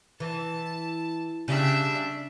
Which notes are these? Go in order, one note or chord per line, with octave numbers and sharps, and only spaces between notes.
E3 A5
C#3 G3 D4 E5